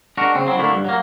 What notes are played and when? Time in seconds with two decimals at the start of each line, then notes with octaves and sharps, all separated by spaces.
0.17 G#3 D4 F#4 A#4
0.35 C#3 C4
0.46 F#3 C4 E4
0.59 D3 A3 A#3 D4 E4
0.72 G2
0.85 F#3 A#3